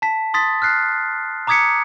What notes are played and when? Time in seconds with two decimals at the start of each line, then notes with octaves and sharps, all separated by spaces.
0.02 A5 B6
0.34 C6 D#6 A6 B6
0.62 F6 F#6 C7
1.47 A#5 D6 D#6 G#6 B6 C#7